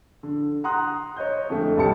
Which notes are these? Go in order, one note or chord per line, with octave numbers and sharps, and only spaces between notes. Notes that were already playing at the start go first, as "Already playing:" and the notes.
D3
F#5 A#5 C6 D#6 F#6
C#5 D#5 G6
F2 D3 G#3 A3
B1 C3 G3 A5 C#7